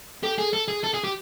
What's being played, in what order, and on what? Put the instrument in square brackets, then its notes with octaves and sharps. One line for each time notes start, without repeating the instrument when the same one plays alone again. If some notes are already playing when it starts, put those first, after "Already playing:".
[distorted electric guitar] G4 [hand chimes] A4
[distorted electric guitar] G#4
A4
G#4
A4
G#4
G4